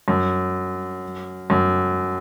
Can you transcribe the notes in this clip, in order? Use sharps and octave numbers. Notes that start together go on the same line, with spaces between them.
F#2
F#2